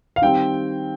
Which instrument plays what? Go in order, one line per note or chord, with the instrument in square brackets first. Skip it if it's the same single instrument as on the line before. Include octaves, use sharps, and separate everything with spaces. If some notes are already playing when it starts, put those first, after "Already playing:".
[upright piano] F5
D#3 G3 C4 G5